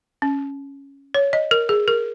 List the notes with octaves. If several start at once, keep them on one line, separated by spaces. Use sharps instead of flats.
C#4
C#5
D#5
A#4
G#4
A#4